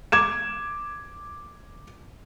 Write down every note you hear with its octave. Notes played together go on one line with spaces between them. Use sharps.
D6 G#6 E7